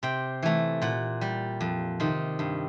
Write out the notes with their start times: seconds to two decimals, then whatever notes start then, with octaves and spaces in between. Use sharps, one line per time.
0.03 C3 G5
0.42 E3 A3
0.82 A#2 F#5
1.21 G3
1.61 F2
2.00 C3 D#3
2.39 G2